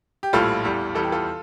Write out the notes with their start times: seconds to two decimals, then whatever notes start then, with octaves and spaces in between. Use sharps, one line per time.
0.23 G4
0.33 A#1 A2 G3 F4 A4
0.64 E2 E3 G3
0.95 E2 E3 G3 A4
1.03 G4
1.12 F4 A4